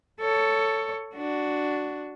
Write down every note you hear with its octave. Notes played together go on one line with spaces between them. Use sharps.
A4 C#5
D4 F#4